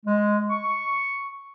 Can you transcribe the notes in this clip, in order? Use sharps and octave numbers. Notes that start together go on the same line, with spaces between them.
G#3
C#6